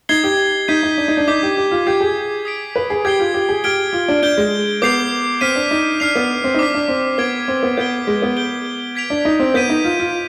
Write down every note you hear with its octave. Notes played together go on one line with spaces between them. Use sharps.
D#4 G#6 C7 G7
G4
D#4 G6 B6 D#7
D#4
D4
D#4
D4
D#4 D6 G6 B6
G4
G4
F4
G4 D6 G#6 C7
G#4
D#6 B6 D7
B4
G#4
G4 G#6 C7 G7
F4
G4
G#4
G4 F6 G#6 D7 G7
F4
D4
D4 G6 D7 G7
G#3
B3 D6 G6 C7 F7
C4 F6 B6 D#7
D4
D#4
D4 F6 C7 F7
B3
C4
D#4
D4 D6 F6 B6
D4
C4
B3 G#6 D7 G7
C4
B3
B3 G6 B6 D7 G7
G#3
B3
G6 D7 G7
G#6 B6 D7 F7
D4
D#4
C4
B3 G6 B6 D#7
D#4
F4
F4